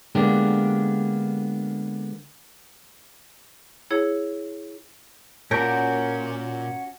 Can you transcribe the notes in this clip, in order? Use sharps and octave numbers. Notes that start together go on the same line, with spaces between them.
D3 G#3 A#3 B3 D4 G4
E4 G#4 C#5
A#2 C#4 F#4 A#4 G6 D7